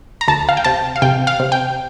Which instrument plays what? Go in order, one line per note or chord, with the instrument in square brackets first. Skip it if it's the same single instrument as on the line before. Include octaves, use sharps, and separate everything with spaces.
[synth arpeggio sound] A#5
D2 A5
F5
G5
C3 A5
F5
C3 G5
F5
C3
G5